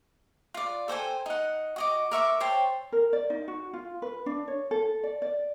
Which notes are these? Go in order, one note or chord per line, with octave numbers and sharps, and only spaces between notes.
F4 D5
A4 C5 G5 G#5
D#4 F#5
F#4 D#5 D6
A#4 E5 C#6 D6
C5 C#5 G5 A5
A#4
D5
D#4
F#4
F4
B4
D4
C#5
A4
D5
D5